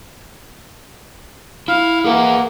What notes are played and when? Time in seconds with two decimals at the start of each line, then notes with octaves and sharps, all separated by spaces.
1.68 E4 F5
2.04 A#3 G#4 B4 F#5